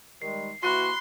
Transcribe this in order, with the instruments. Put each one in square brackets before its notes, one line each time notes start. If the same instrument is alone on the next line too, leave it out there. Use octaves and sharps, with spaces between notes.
[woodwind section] D#3 G3 G#3 [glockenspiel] C7
[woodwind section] E3 A#3 [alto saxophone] F#4 [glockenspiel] B5 F#6 C7 [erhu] C6